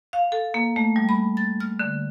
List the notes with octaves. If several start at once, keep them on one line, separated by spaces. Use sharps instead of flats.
F5
A4
A#3
A3
G3
B5
A6
F6
D3